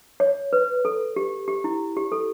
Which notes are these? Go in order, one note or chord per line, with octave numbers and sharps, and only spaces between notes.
C#5
B4
A4
G4
G4
E4
G4
A4